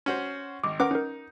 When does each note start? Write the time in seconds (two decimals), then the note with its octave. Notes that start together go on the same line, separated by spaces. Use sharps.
0.06 C#4 F#4 C5
0.64 G#1 D6
0.80 C#4 A#4 B4 F#5 D6
0.91 C#4 D#4 A#4